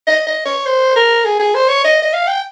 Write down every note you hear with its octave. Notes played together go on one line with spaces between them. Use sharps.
D#5
D#5
C#5
C5
A#4
G#4
G#4
C5
C#5
D#5
D#5
F5
G5